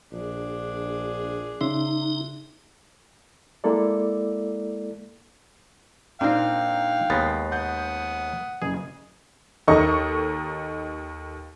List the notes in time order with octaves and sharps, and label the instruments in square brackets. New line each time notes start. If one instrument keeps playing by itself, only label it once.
[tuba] A#1 [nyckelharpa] D4 G#4
[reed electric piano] C#3 E5 C6 [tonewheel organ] D#4
[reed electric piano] G#3 A#3 E4 A4 D5
[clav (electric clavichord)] A#2 C4 [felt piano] D4 D#4 [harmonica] F5 G5
[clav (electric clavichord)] D#2 G#3 B3 [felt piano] A6 C7
[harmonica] F#5 D#6 [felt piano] G6
[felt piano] F#1 [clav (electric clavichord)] G#4
[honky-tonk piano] D#2 D#4 A4 A#4 D#5 C#6